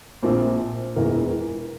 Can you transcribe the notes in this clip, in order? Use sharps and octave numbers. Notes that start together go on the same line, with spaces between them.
A#1 A#2 F3 C4
E1 E2 E3 A#4